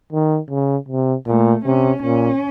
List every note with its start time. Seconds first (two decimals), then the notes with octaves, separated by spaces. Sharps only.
0.12 D#3
0.50 C#3
0.88 C3
1.27 A#2 A3
1.65 C3 C#4
2.03 A#2 C#4